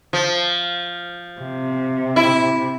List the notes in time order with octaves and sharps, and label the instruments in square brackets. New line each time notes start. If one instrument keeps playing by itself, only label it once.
[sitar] F3
[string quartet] C3
[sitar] E4